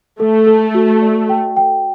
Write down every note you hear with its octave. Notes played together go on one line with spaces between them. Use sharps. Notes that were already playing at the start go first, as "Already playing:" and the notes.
A3 A4
A4
F#4
D5
G5
G5